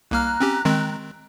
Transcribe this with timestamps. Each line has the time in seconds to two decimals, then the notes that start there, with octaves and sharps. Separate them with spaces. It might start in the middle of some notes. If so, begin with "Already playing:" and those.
0.11 C2 A#3 A#5 F6 F#6
0.40 C4 C#4 G4
0.65 D#3 G#3 C4